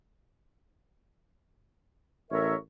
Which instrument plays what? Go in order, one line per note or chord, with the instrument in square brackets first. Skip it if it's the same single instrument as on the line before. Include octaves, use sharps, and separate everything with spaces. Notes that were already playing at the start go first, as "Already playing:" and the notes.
[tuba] A1 [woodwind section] A#4 C#5 E5